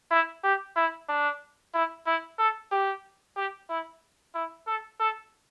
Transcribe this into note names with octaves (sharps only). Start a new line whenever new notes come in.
E4
G4
E4
D4
E4
E4
A4
G4
G4
E4
E4
A4
A4